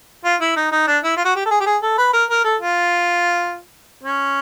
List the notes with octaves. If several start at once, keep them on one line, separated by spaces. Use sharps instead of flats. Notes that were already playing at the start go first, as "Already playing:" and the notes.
F4
E4
D#4
D#4
D4
E4
F4
F#4
G4
A4
G#4
G4
G#4
A4
B4
A#4
A#4
A4
F4
C#4